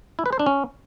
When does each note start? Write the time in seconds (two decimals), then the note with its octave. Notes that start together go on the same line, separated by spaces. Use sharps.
0.19 E4
0.26 B4
0.33 C5
0.39 D4
0.46 C#4